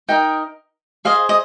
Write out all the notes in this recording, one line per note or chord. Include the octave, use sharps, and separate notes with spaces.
D#4 A#4 D#5 G5
G#4 C5 D#5 F5
D#5